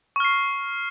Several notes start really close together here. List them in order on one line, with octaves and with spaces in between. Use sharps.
C#6 F6 C7